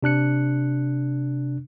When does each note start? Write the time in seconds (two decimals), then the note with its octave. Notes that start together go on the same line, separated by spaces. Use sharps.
0.03 C3 D4 F#6 C#7